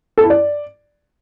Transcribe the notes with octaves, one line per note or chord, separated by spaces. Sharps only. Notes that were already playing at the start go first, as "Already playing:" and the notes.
A4
E4
D5